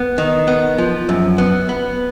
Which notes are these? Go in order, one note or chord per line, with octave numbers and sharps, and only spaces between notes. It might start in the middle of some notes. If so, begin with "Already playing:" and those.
Already playing: B3
D#3
B3
F3
F#2
B3
B3